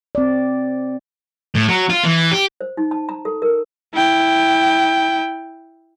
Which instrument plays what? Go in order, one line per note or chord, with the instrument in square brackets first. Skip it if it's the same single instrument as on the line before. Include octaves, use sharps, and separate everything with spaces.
[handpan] C4 D5
[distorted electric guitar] A2
F#3
F4
E3
G4
[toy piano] C5
D#4
A5
A#5
A4
A#4
[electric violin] E4 G5